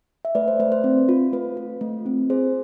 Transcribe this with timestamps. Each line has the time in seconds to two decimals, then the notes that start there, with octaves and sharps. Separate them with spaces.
0.25 E5
0.35 A3 B4 D5
0.48 C5
0.60 A3 B4
0.72 C5
0.84 C4
1.09 F4
1.33 A3 B4
1.57 F4
1.81 A3
2.06 C4
2.30 G#4 C5